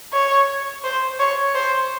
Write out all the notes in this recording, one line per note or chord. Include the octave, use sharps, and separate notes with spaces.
C#5
C5
C#5
C5